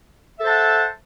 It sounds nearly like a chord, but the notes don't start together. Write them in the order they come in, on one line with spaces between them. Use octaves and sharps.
E5 A4 C5 A5 F#5